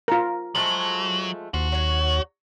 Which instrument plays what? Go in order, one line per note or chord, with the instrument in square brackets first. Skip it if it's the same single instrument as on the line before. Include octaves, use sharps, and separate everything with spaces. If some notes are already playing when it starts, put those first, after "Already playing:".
[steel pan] F4 A#4
[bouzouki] F3 G#3 A3 [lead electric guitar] F#3
[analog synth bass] D#2 [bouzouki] F3 [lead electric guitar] F#4
[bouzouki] F#3 C#5